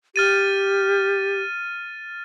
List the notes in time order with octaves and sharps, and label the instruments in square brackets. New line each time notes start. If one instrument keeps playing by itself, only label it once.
[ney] G4 [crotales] F6 A6 D#7